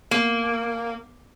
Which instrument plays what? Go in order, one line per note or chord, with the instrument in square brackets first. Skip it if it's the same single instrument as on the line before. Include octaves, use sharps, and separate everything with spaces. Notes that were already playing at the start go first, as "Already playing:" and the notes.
[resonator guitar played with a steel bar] A#3